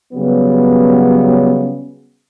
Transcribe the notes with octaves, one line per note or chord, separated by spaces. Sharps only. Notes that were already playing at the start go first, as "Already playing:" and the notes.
C#3 F#3 G3 B3